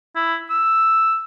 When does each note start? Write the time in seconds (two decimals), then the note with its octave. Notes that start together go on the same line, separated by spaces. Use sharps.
0.16 E4
0.50 E6